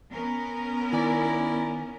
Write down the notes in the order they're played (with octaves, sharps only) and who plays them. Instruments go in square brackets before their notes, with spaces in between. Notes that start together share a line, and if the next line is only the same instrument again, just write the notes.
[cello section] B3 C#4 A#4
[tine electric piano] D#3 G#5 [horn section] E4 D5 A#5